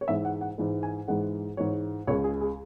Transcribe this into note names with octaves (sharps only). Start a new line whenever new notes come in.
C#5
G#2 E3 G#3 E5
F#5
F#5
G#2 E3 G#3
G#5
G#2 E3 G#3 F#5
G#2 E3 G#3 C#5
C#2 C#3 G#3 C#5
G#4
G#4